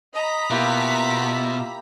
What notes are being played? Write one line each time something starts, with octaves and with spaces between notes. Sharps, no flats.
D#5 A#5 B5 B6
B2 A#3 E4 F4 G4 E5